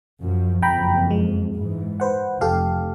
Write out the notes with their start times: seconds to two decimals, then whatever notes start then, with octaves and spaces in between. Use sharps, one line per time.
0.20 F#2 F3
0.62 F#1 F2 G5 A#5 B5
1.11 G#3
1.54 G#2 E3
2.00 B4 C5 F#5
2.41 F1 G4 A4 F5